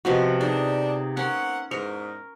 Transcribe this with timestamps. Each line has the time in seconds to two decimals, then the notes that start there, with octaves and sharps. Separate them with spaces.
0.05 C3 F3 B3 F#4 D#5
0.41 D4 D#4 G#4
1.17 A#3 C4 C#4 F#5
1.71 E2 G#2 A#4 C#7